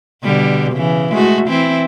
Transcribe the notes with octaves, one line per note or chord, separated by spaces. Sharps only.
B2 D3 G3
C#3 E3
G#3 A3 F#4
E3 C4 E4